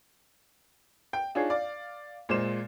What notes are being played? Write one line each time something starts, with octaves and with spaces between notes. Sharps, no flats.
G5
D4 D#4 F4 G#4 C#5
D5 F5
A#2 G#3 C5 E7